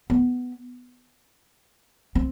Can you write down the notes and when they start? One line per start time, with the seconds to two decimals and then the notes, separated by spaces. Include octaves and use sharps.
0.10 B3
2.15 C4